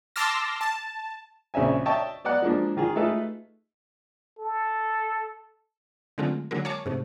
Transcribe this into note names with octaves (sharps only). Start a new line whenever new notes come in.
A5 C6 D6 E6 F6 A#6
A5
A#1 C#3 C4 E5 G#5
D#5 E5 G5 A5 C#6
B3 D5 D#5 F#5 F#6
F3 G#3 A#3 D4
D#3 F4 G#4
A3 D#4 F4 G#4 A4 B4
A4
D3 F#3 G#3 A3 C4 F4
D3 F#3 G#3 A#3 A#4
C#5 F5 G#5 A5 C#6 D6
G#2 C3 A3